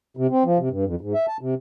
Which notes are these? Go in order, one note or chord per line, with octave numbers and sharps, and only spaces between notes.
C3
C4
F3
C3
G2
F2
G#2
E5
A5
C3